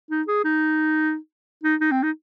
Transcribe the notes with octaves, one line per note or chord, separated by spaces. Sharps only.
D#4
G#4
D#4
D#4
D#4
C4
D#4